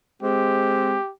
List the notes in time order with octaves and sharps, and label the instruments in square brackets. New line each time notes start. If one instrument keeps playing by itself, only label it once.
[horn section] G#3 C4 [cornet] G4